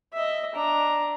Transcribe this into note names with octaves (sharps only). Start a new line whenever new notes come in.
D#5 E5
D4 A#5